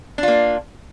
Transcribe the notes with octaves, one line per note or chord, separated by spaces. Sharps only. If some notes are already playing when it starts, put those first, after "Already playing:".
A#3 D4 F4